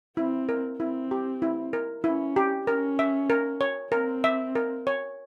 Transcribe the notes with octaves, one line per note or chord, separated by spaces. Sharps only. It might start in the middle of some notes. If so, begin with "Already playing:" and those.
C4 E4
A#4
C4 E4
G4
E4
A#4
C#4 E4
G4
C#4 A#4
E5
A#4
C#5
C4 A#4
E5
A#4
C#5